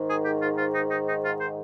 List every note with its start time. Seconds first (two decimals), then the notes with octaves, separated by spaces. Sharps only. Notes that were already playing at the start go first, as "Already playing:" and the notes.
Already playing: G#2 D#3
0.09 G#4
0.25 G4
0.42 F4
0.58 F4
0.74 D#4
0.91 D#4
1.07 D#4
1.24 F4
1.41 C5